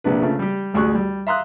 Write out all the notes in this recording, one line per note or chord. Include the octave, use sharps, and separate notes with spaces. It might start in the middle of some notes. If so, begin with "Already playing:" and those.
A#1 C3 D4 B4
C#3 F3 A3
G3 G4
A1 D2 G#4 C#6 F#6
G3
E5 F5 A#5 C6 D#6 F#6